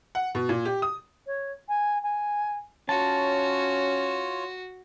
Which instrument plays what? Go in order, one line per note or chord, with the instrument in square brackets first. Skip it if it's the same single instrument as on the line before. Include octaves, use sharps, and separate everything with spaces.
[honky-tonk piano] F#5
B2
A#2
G4
D#6
[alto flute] C#5
G#5
G#5
[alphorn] C#4 [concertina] F4 C#5 [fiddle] F#4 [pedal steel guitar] A5